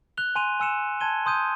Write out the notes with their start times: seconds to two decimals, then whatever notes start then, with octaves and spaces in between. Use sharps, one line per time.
0.17 F#6 F7 G7
0.35 G#5 C6 D#7 F7
0.60 G#5 E6 C#7 E7 F7
1.00 A5 C6 G#6 D#7 G7
1.26 C6 D#6 G6 D#7